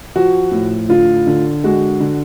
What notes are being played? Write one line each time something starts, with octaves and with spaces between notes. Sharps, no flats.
F3 F#4
A2
D3 F4
D3
G#3 F#4
D3